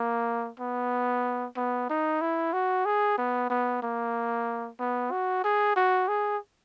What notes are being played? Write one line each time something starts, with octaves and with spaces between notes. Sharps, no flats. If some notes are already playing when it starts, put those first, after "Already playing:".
Already playing: A#3
B3
B3
D#4
E4
F#4
G#4
B3
B3
A#3
B3
F#4
G#4
F#4
G#4